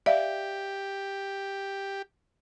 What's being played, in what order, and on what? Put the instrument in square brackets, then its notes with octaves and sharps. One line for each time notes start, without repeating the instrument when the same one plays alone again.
[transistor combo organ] G4 [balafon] D5 E5 F5